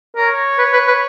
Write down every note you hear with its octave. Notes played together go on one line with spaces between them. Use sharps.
A#4 C#5
B4
B4
B4